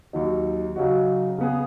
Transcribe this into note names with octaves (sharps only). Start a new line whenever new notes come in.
D#2 D#3 F#3 D#4
C#3 F#3 D#4 F#4
C#3 B3 G#4